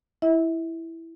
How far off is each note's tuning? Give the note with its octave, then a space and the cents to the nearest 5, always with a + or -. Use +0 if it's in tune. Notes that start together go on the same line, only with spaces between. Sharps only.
E4 +0 E5 -30